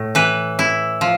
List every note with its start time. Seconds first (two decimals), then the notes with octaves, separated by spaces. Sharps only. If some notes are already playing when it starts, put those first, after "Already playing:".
Already playing: A2
0.15 E3 B4
0.59 E4
1.01 F3